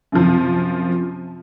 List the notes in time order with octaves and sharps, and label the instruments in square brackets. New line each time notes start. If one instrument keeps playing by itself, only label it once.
[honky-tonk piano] F#2 C3 F3